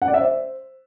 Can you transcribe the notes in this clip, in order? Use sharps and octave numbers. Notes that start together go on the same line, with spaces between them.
F#5
D5
E5
C5